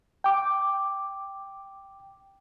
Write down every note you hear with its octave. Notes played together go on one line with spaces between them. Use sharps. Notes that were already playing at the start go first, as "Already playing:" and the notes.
G5 D6